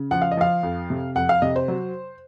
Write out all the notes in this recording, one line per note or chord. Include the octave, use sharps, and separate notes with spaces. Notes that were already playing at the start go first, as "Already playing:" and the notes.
Already playing: C#3
F3 F#5
F5
D#5
F3 F5
F2
C3
F2 F#5
F5
C3 D#5
C5
F#3